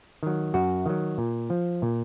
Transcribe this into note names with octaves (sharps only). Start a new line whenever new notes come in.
D#3 F#3
F#2 F#4
D#3 F#3
A#2
F3
A#2